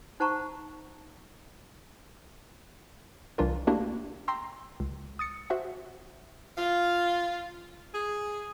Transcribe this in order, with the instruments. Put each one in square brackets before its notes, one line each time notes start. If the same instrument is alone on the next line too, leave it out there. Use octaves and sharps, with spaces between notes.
[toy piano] D#4 C5 F#5 A5 A#5 C#6
[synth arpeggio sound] C2 E3 D4 F4 A#4
A3 A#3 D4 E4 F#4 G4
G5 A#5 C6 E6
C#2
D#6 A6 C#7
F#4 C5 E5 F#5
[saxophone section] F4
G#4